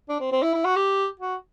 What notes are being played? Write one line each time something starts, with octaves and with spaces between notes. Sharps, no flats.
D4
C4
C4
E4
E4
F#4
G4
F#4